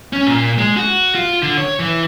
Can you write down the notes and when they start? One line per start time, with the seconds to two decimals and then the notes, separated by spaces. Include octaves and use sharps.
0.13 C#4
0.27 A#2
0.58 G#3
0.77 F#4
1.15 F4
1.42 D3
1.58 C#5
1.80 E3